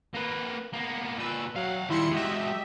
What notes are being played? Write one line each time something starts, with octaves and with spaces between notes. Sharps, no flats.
A#3 B4
A#3 B3
A#2 B4 E6
F#3 F5 F#5
D#3 G3 E4 C6 C#7
G#3 F#4 G4 D#5 E5